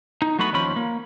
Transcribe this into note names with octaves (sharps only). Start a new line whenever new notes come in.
D#4
F#3 A3 B3 F#4 B5
D#2 F3 C#4 B5
A#3